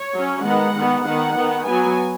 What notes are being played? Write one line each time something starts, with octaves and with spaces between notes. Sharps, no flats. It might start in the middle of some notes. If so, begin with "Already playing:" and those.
Already playing: C#5
F#3 C#4
D#3 G#3 B3 F#5
D#3 B3
D#3 B3 F#5
D#3 B3
F#3 B3 G#5